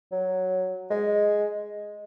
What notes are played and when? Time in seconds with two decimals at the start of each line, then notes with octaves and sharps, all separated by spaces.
0.12 F#3
0.91 G#3